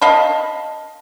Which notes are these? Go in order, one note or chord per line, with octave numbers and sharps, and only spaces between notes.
D#5 F5 A5 B5